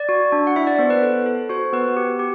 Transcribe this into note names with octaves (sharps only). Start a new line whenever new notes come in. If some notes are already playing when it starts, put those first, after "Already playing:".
Already playing: D5
F#4
D4
F#5
E4 E5
D5
B3 C5
B4
A4
A4
F#4 C5
B3 B4
G4
G4